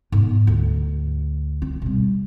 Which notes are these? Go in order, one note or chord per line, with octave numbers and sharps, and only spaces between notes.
G#2 B3
D2
C4
B2 G3